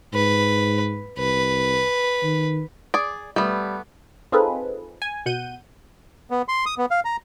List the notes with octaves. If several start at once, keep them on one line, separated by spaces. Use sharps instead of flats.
G#2 B4
C2 B4
D#3
G#4 D5
G3 A3 B3
C4 D#4 F4 G#4 A4 B4
G#5
B2 F#5 G6 D#7
B3
C6
D#6
B3
F5
A#5